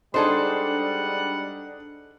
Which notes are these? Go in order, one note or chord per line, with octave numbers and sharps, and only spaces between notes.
G3 G#3 D4 D#4 G#4 A4 C5 F#5